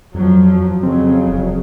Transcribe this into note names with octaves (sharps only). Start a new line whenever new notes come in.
F2 F3 F#3
F2 C#3 F#3 C4
E1